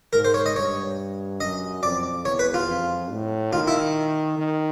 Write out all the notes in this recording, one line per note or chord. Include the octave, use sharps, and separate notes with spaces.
G#2 A#4
C5
C#5
D#5
G2 C#5
F#2 D#5
F2 D5
E2 C#5
B4
F4
F2
A2
D#3 F4
E4
D#3